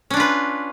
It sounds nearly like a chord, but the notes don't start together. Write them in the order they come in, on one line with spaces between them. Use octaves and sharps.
C#4 D4 F4 B4